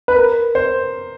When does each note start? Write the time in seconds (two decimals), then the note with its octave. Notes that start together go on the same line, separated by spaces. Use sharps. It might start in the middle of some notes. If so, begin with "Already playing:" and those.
0.08 B4
0.16 A#4
0.55 C5